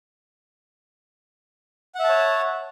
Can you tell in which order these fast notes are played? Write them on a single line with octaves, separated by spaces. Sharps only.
F#5 E5 A5 C#5